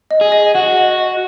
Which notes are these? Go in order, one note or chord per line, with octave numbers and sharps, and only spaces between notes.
D#5
G#4
D#5
F#4 F#5
D#5
D#5